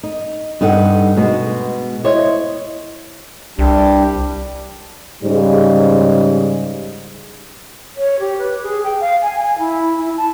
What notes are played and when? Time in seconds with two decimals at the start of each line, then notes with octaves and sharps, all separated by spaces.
0.03 D#4
0.61 G2 D#4 A4 F#5
1.16 B2 G#3 B3
2.04 E4 C5 C#5 D#5
3.59 C2 G3 D4 G4
5.24 G#2 C#3 G3
7.96 C#5
8.19 G4
8.38 B4
8.62 G#4
8.84 G5
9.00 F5
9.22 G#5
9.43 G#5
9.58 E4
9.97 E4
10.17 A5